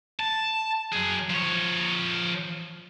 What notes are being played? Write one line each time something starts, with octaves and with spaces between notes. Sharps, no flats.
A5
F#3 G#4
F3 C#5